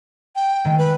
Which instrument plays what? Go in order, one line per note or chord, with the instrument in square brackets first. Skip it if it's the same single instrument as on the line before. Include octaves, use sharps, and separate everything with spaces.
[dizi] G5
[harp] D#3 G#3 A3
[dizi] B4